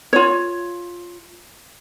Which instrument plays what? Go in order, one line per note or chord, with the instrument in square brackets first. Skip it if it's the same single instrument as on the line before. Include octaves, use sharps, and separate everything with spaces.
[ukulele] F4 C#5